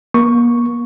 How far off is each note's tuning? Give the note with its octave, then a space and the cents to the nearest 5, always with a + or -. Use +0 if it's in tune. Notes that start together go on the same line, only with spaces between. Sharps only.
A#3 +40 C#6 +0